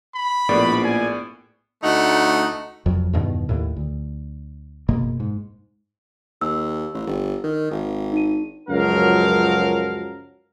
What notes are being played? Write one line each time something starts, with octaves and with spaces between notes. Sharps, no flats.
B5
A#1 A2 B3 D5
G#5
D2 A3 D#4 F#5
F1 F2 F#3
E2 G2 B2 D#3
D#2 A2
D2
F#1 B2 A#3
G#2
D#2 E6
A1
G1
D#3
G#1
D#4 D#7
C#2 F#2 F3 F#3 A#4 F5